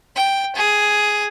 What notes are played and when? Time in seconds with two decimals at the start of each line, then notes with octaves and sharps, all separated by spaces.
0.16 G5
0.56 G#4